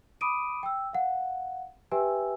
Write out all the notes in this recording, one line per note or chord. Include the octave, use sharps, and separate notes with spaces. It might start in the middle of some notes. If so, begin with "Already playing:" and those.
B5 D6 D#6 D7 D#7
G5 E6
F5 F#5
G4 B4 E5 G5 G#5 E6